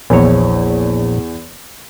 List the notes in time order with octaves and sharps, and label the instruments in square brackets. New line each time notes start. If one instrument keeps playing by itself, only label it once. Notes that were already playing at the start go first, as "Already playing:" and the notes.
[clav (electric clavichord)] A#1 C#5 [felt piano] E2